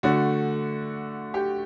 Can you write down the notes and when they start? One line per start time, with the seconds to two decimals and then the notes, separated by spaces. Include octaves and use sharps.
0.03 D3 A3 F#4
1.34 G4